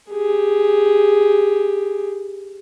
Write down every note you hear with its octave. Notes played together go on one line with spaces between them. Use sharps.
G4 G#4